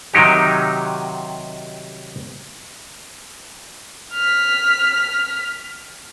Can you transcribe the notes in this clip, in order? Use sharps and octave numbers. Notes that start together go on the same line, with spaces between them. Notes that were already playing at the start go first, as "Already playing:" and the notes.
C3 D#3 F#3 D#4 G4
F6 B6